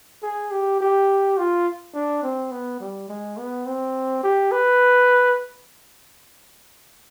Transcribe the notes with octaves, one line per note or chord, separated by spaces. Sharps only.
G#4
G4
G4
F4
D4
C4
B3
G3
G#3
B3
C4
G4
B4